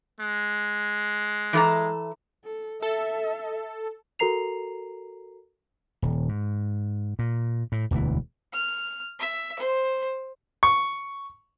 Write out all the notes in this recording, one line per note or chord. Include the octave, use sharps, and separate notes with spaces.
G#3
E3 A4 A#5
A4
A4 E5
F#4 A4 A#4 A#5 C7 F7
D#1
G#2
A#2
A2
E1 D2 C3 E3
F6
E5
C5
C#6